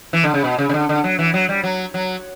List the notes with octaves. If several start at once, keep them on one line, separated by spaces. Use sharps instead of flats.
E3
D3
C#3
B2
C#3
C#3
D3
D3
F#3
E3
F#3
G3
F#3
F#3